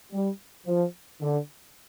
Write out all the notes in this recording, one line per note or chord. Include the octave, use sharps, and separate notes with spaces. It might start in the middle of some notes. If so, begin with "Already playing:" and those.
G3
F3
D3